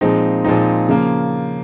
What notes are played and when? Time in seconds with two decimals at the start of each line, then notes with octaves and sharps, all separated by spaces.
0.01 A#2 F3 G#3 C4 D#4
0.44 A#2 F3 G#3 C4 D#4
0.89 C#3 F3 A#3